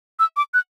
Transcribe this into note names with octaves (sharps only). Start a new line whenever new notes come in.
E6
D6
F#6